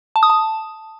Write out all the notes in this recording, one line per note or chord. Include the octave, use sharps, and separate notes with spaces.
A5
D#6
A5